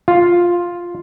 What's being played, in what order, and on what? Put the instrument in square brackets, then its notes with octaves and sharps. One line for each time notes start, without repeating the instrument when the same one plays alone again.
[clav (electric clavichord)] F4